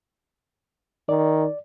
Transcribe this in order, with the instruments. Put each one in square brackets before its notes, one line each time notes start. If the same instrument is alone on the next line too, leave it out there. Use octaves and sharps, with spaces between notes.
[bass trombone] D#3 [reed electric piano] D5